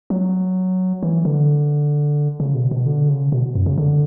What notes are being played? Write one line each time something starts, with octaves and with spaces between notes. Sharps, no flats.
F#3
E3
D3
C#3
B2
B2
D3
C#3
B2
F#2
C#3
D3